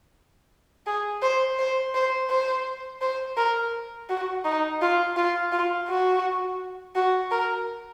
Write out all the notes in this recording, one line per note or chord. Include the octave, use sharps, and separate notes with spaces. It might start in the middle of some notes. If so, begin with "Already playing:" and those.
G#4
C5
C5
C5
C5
C5
A#4
F#4
D#4
F4
F4
F4
F#4
F#4
A#4